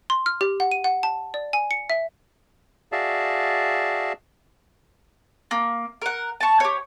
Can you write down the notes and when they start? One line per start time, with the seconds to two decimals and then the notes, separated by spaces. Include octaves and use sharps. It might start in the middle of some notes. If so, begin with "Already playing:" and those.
0.10 C6
0.26 F6
0.41 G4
0.60 F#5
0.72 D#7
0.84 F#5
1.03 A5
1.34 D5
1.53 G#5
1.71 C#7
1.90 E5
2.92 F#4 G#4 D5 E5 F5 A5
5.51 A#3
6.02 A#4 F#5
6.40 A5 C#6
6.60 G4 C#5